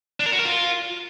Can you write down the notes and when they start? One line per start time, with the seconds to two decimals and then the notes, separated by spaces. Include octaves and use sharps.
0.20 D4
0.26 A#4
0.33 F#4
0.39 A#4
0.45 F4